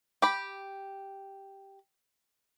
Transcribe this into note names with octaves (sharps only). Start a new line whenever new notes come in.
G4 B5